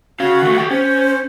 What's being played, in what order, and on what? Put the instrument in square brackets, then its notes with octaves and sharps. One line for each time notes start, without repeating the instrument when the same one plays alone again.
[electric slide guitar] C#4 F5 [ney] F#4
[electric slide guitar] D#3 A3
G4 A4 G5
[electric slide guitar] C#4 [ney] C5